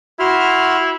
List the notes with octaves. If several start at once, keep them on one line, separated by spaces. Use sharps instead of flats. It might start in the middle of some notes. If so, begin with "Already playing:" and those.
E4 F#4 C6 F6